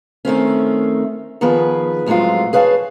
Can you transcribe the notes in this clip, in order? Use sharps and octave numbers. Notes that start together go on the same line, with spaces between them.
D#3 A3 C4 C#4
D#3 F3 B3 G#4 B4
F2 A2 F#3 G#3 F4
G#4 B4 C#5 F5 A5